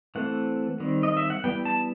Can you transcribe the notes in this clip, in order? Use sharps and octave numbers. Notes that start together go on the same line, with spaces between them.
E3 A3 C4 F#5
D#3 G3 C4
D#5
E5
F#5
E3 G3 B3 G5
A5